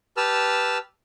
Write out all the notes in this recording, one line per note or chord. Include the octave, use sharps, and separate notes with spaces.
G4 B4 A5 E6 F6